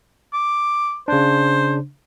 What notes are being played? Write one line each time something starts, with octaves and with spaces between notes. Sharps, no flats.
D6
C#3 D4 C5